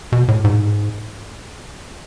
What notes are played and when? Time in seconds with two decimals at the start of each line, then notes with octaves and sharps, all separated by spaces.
0.12 B2
0.28 A2
0.44 G#2